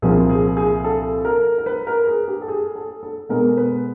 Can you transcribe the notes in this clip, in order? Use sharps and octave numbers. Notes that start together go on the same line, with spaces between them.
C2 A#2 F3 A#3 G#4
G#4
G#4
A4
A#4
A#4
B4
A#4
G#4
G4
A4
G#4
A4
A4
B2 G#3 B3 A#4
B4